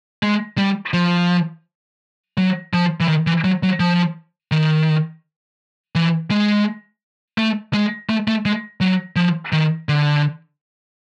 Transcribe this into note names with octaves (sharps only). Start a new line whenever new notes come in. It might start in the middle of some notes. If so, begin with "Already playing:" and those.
G#3
G3
F3
F#3
F3
E3
D#3
E3
F#3
F#3
F3
D#3
E3
G#3
A3
G#3
A3
A3
G#3
F#3
F3
D#3
D3